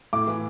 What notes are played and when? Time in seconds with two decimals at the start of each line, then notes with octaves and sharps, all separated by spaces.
0.13 A2 D6
0.27 E3